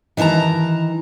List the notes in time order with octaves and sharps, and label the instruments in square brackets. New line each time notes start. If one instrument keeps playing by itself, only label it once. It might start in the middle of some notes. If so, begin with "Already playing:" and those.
[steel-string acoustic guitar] D#3 E3 D#5 A5 A#5